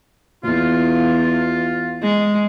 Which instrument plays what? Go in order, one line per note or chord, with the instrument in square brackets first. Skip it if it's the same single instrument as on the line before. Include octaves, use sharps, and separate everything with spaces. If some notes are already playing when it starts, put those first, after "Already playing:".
[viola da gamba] E2 [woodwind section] F4
[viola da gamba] G#3